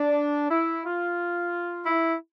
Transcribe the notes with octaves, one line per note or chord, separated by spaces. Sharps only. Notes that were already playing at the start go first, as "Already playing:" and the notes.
Already playing: D4
E4
F4
E4